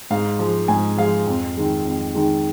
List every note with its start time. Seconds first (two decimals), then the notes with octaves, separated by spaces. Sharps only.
0.10 G#2 F5
0.39 F3 G#3
0.68 G#2 G#5
0.98 F3 G#3 F5
1.27 F2
1.57 D#3 G#3
1.85 F2
2.14 D#3 G#3